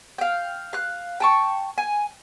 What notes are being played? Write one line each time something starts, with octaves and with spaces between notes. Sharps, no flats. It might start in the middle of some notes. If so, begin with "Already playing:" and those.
F5 G5
F5 F#6
G5 A5 C#6
G#5